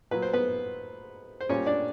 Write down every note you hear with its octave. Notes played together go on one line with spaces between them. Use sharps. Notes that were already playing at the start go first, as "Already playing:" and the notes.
A#2 F#3 B4
C5
B3 B4
C5
A#2 G3 C#4 C#5
D4 D5